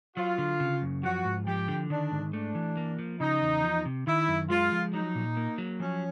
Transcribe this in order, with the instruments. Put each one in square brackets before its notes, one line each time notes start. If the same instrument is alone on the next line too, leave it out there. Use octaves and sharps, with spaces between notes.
[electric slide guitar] F#3 [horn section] F4
[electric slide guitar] D3
C#3
F#2
[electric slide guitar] F3 [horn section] F#4
[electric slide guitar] G#2
[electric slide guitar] F3 [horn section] G4
[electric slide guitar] D3
[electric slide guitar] D#3 [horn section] D4
[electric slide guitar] G#2
[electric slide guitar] A3 [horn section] D4
[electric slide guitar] E3
A#3
F3
[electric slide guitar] C#3 [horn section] D#4
[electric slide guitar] E2
F3
C3
[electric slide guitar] D#3 [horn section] E4
[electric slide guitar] F#2
[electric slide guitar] G#3 [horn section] F4
[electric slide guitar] F3
[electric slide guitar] F#3 [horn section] D#4
[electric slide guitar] A#2
A#3
F#3
[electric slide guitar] F3 [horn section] C#4